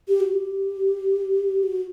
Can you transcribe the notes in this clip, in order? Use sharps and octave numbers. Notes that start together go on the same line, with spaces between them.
G4
F#4
G4
F#4